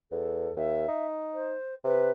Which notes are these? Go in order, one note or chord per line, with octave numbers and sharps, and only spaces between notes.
E2 A4
D#2 E5
D#4
C5
C3 B4